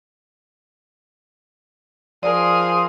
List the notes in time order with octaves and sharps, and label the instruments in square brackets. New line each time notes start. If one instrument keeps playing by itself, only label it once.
[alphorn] F3 [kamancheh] G#4 A#4 [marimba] D5 [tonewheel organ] C6 D#6